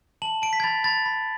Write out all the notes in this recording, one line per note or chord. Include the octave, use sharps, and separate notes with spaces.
A5 F#7
A5 D7
B6
G#6
B5 A6
B5 A6
B5